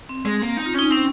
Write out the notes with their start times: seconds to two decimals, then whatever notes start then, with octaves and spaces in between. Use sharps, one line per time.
0.09 C4
0.26 G#3
0.42 A#3
0.57 D#4
0.66 F4
0.74 C#4 D#4
0.90 C4 C#4